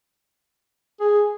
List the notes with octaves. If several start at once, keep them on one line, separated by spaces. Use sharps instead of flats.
G#4